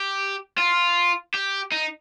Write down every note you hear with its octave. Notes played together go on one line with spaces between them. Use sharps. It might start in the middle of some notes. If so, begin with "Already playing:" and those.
Already playing: G4
F4
G4
D#4